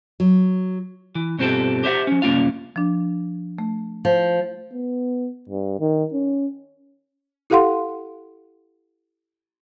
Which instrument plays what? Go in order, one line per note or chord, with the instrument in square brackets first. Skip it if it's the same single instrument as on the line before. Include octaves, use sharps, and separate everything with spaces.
[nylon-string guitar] F#3
[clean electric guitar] E3
G2 B2 C4 F4 G4 A4
G4 C5 E5 F#5
F3 C#4
C2 F#2 A#3 C#4 F4 F5
[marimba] F3 D4
A3
[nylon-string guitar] F3
[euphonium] B3
G2
D#3
C#4
[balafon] E4 G4 A4 F5 F#5 C6